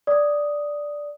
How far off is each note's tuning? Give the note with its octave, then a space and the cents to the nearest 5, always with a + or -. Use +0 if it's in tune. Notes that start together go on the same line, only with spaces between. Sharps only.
D5 +0 D#6 +0